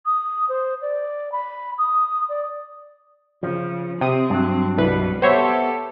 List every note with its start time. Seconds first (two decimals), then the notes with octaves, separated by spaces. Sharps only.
0.06 D#6
0.49 C5
0.82 D5
1.32 B5
1.78 D#6
2.29 D5
3.43 C#3 F3
4.01 C3 C4 D#6
4.30 G2 F#3
4.78 C2 B2 G3 B4
5.22 B3 G4 A4 C5 C#5 E5